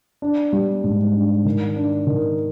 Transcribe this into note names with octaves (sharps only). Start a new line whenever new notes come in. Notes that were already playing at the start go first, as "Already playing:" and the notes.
D4
G3
G#2
D4
D#3
D4
D#3